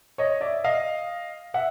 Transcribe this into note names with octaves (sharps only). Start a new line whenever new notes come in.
C#5 D#5
D5 E5
D#5 F5
E5 F#5